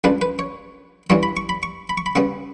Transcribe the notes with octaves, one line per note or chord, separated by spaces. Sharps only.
C#2 C#3 G3 D4 B4
B4
C#5
G2 E3 G3 C#5
B5
C#6
B5
C#6
B5
C#6
B5
C#3 G3 B3 C#6